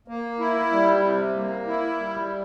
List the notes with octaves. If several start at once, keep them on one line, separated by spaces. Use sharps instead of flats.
A#3
E4
G3
C3
A#3
E4
G3